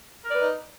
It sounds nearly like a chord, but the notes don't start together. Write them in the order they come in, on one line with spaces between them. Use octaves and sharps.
A#4 D5 B4 D#4